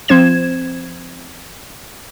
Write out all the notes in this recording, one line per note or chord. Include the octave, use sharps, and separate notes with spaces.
F3 C4 C5 G#6 E7